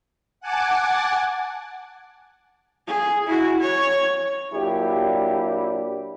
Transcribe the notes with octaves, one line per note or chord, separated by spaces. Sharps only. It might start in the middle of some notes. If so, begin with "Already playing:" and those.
F#5 G#5 A5 D6
G#4
E4 F#4
C#5
A#2 F#3 D4 E4 G4